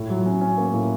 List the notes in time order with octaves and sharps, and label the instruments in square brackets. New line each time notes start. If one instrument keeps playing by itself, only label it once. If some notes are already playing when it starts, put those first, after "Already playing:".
Already playing: [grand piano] A2
F#3
C#4
C#4
A#3
A2